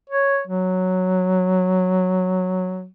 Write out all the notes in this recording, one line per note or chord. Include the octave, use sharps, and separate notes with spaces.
C#5
F#3